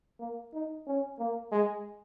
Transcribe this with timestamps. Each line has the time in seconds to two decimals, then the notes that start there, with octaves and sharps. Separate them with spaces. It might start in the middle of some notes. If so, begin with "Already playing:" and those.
0.20 A#3
0.53 D#4
0.87 C#4
1.19 A#3
1.52 G#3